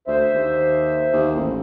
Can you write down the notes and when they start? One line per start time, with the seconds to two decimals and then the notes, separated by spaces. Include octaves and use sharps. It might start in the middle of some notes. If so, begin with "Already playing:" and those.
0.07 D2 C5 E5
0.34 D#2
1.13 D#2
1.36 A1